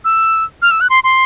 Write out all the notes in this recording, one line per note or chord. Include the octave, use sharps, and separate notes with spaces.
E6
F6
E6
F#6
C6
C6